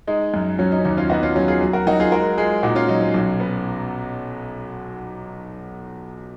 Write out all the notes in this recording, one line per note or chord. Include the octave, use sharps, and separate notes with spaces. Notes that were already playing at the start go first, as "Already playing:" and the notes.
G#3 D#4
F#2
F#3 C#4
D#4
C#4
D#2 D#4
C#4 F4
B3 D#4 F#4
C#4 F4
F#3 C#4
F4 G#4
F#3
F#4 A#4
F#3 D#4 F#4
F4 G#4
G#3 F#4 A#4
G#3 F4 G#4
A#2 D#4 F#4
C#4 F4
F#3 D#4
C#4
B1
B3